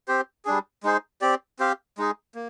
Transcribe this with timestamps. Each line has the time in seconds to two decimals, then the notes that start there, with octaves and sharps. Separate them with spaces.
0.08 C4 G4 C5
0.45 G3 D4 G#4
0.83 G#3 D#4 G#4 C5
1.21 C4 G4 D5
1.59 C4 G4 C5 F5
1.98 G#3 D#4 G#4
2.35 A#3